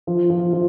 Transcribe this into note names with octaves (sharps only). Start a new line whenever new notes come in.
F3
F3
F3